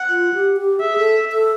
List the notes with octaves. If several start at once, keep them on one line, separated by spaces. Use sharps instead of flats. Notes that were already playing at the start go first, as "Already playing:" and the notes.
Already playing: F#5
F4
G4
G4
G#4 E5
A4
A4